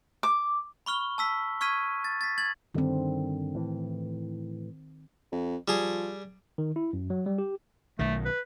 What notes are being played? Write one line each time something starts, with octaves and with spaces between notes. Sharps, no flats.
D6
B5 C#6 F6 G7
A5 E6 B6
C#6 F6 G#6 B6 D#7
A6
A6 B6
G#6 A6 F#7
G2 D3 D#3 C4
A2 E3
F2
F3 G3 G#4
D#3
E4
F#2
F#3
G3
G4
B1 D#3 A3
B4